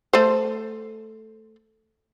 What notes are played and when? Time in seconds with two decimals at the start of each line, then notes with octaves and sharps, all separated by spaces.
0.13 A3 C5